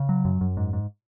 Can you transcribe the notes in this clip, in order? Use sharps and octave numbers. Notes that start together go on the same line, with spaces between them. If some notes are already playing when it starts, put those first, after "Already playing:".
Already playing: C#3
F#3
F#2
F#2
G#2
G#2